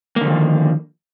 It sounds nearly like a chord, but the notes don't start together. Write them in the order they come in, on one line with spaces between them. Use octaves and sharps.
A#3 D3 F3 D#3